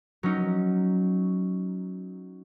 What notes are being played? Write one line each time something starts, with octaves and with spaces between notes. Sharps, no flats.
F#3 C#4 D#4